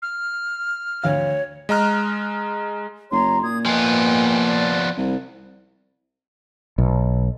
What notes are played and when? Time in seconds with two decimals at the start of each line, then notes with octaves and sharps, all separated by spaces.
0.02 F6
1.04 D2 C#5 F5
1.69 G#3 D#5 A#5 F6 F#6
3.12 F#1 C#5 A#5 C6
3.43 A#2 D#6 G#6
3.66 F3 B3 D#5 G5 G#5
4.46 D5
4.97 C2
6.78 B1